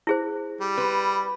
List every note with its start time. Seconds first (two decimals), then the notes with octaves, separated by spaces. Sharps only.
0.07 E4 G#4 C5
0.61 G3
0.78 B4